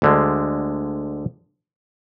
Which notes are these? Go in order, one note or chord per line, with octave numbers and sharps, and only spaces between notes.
D2 D3 G#3